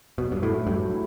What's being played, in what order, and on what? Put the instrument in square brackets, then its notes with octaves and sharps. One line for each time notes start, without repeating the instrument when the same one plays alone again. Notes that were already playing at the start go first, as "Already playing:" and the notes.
[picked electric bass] B2 [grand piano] F#3
[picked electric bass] G2
[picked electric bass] A2 [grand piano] A3 E4
[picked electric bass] G2 [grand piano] F#3
[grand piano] E4